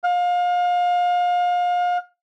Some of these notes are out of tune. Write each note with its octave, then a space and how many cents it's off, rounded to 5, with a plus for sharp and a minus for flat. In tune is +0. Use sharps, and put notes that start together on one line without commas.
F5 +30